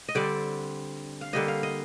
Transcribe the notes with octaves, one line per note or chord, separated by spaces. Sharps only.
D#5
D3 G3 C4 D5
F5
D3 G3 A#3 D#5
F5
D#5